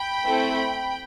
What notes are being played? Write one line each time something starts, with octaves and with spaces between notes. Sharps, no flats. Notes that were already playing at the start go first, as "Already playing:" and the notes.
Already playing: G5 B5
A3 C4 E4 A4